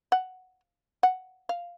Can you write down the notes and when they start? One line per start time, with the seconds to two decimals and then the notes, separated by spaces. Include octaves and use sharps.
0.12 F#5
1.03 F#5
1.49 F5